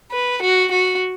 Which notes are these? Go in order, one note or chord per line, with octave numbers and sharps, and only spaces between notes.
B4
F#4
F#4